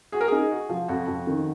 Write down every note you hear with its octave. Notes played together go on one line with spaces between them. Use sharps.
F#4 G#4
A#4
D#4 G#4
F#4
F3
F2 F#4
F2
D#3